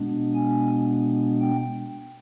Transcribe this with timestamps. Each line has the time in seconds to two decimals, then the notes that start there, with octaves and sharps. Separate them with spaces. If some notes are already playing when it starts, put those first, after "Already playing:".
Already playing: B2 G#3 B3 D4
0.34 G#5
1.41 G5